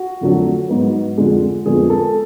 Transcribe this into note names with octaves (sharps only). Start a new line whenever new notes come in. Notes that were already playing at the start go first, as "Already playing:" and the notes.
Already playing: F#4
F2 D3 F#3 A3
G#2 F#3 B3
F2 D3 G#3
F2 D3 G#3 B3 G#4
A4